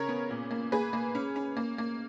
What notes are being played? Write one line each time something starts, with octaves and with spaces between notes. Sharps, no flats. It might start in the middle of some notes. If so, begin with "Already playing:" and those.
Already playing: C#3 A#4 C#5
B3
A#2
A#3
A#3 G#4 B4
A#3
C#4
C#4
A#3
A#3